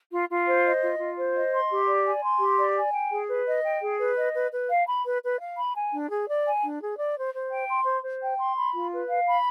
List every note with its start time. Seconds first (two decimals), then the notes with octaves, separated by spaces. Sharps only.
0.12 F4
0.29 F4
0.47 C5
0.64 D#5
0.82 F4
0.99 F4
1.17 C5
1.34 D#5
1.52 C6
1.70 G4
1.88 D5
2.05 G#5
2.22 C6
2.40 G4
2.58 D5
2.76 G#5
2.93 G5
3.10 G#4
3.28 B4
3.46 D#5
3.64 G5
3.81 G#4
3.99 B4
4.16 D#5
4.34 B4
4.51 B4
4.69 F5
4.87 B5
5.05 B4
5.22 B4
5.39 F5
5.57 B5
5.75 G#5
5.92 D4
6.10 G#4
6.27 D5
6.45 G#5
6.63 D4
6.80 G#4
6.98 D5
7.16 C5
7.33 C5
7.51 G5
7.68 C6
7.86 C5
8.03 C5
8.21 G5
8.39 C6
8.56 B5
8.73 F4
8.91 B4
9.08 F5
9.26 B5